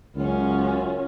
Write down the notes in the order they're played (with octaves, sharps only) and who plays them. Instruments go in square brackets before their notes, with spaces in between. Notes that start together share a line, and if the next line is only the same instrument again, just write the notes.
[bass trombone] C#2 [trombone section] F#2 A#2 F#3 [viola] C#4 F4